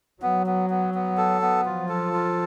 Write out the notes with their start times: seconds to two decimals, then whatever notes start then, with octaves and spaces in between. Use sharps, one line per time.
0.22 F#3 B3
0.47 B3
0.70 B3
0.94 B3
1.17 A4
1.42 B3
1.65 F3 F4
1.89 A4
2.13 F4